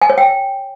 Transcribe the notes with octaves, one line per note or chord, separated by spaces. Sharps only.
G#5
C#5
G5